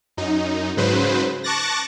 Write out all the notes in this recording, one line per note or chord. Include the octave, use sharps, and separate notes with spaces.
F#2 D#4
G#2 C#3 F#3 B4 C5
A5 C#6 D6 F#6 A6 A#6